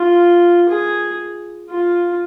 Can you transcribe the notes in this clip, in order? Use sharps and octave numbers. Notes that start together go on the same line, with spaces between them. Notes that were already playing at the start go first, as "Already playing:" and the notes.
Already playing: F4
G#4
F4